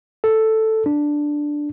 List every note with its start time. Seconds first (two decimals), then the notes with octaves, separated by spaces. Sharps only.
0.24 A4
0.86 D4